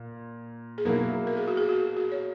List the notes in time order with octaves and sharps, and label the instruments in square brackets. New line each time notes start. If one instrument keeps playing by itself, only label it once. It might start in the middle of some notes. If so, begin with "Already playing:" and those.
Already playing: [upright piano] A#2
[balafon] G#4
[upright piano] B2 F#3 A#3 E4 [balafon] A#4
[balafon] A#4
G#4
F#4
G#4
F#4
F#4
C#5